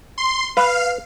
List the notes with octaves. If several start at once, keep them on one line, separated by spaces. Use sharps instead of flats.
C6
B4 F5